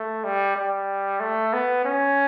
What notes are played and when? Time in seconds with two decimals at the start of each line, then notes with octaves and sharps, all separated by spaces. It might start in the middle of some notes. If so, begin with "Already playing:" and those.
Already playing: A3
0.24 G3
0.56 G3
1.20 A3
1.53 B3
1.85 C#4